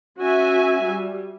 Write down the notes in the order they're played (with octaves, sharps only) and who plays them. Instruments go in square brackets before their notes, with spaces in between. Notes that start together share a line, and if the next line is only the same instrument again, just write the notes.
[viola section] C#4 F#4 E5 G#5
G3